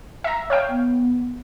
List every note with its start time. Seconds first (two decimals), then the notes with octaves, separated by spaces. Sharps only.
0.24 E5 A#5
0.50 C#5 F5 G5
0.69 B3